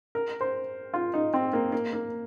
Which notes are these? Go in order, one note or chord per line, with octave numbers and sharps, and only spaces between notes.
A#4
C5
F4
D#4
C4
A#3
A#3
A#3